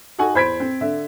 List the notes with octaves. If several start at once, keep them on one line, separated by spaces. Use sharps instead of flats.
D#4 F#4 A4 F#5 G#5 C#6
E2 C5 B5 G#6 B6 D7
C4
D3 E5